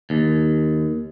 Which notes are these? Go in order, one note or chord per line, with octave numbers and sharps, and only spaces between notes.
D#2